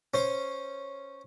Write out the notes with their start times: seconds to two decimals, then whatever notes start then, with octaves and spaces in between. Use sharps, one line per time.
0.14 C#4 C5